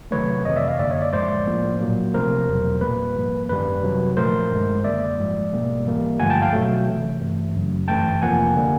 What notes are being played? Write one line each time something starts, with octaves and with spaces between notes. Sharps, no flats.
C3 D#3 F#3 A3 B4 C#5
F2 C3 E3 C#5 D#5
D5 E5
D#5 F5
F#2 D3 G3 A#3 D5 E5
C#5 D#5
D5 E5
A2 F3 G#3 C5 D5
A2 F3 A#3
A#2 F#3 A#3
C3 F3 A3 A#4 C5
E2 B2 F#3
A#2 G3 A#3 B4
G#2 F3 A#3
F#2 D#3 G3 B4
C3 D#3 F#3
A#2 F3 A3 A#4 C5
G2 D#3 G#3
F#2 D3 G3 A#3 D5 E5
G#2 F3 G#3
B2 G3 A#3
G#2 E3 G3 A#3
G2 D3 F3 A3 F#5 G#5
G5 A5
F5 G5
B2 F#3 A3
C3 E3 A3
G2 E3 A3
F#2 C#3 F#3
G2 E3 A3 G5 A5
F2 C3 F3 A#3 F#5 G#5
D3 G3 A#3